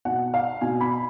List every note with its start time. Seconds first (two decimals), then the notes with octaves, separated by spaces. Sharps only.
0.05 B2 F#5
0.34 F5
0.61 B2 G#5
0.81 B5